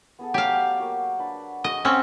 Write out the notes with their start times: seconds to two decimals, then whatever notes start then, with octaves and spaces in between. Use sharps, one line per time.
0.19 B3 G#4 A4
0.34 F#3 G4 F5
0.80 A#3 F#4
1.19 D4 B4
1.64 F#4 G#4 D#5 F#5
1.85 C4 C#4